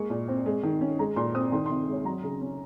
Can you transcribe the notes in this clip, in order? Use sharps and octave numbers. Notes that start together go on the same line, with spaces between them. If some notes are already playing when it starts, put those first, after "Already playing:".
Already playing: G#3 A#3 C#6
A#2
C4
G#3
D#3
C#4
G#3 A#5
A#2 C6
C4 D#6
D#3 C6
C3 C6
G#3 C#5
F#3 A#5
C#3
C#4